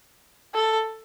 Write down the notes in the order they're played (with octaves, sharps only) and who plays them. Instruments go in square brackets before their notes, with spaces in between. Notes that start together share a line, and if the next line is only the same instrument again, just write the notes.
[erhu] A4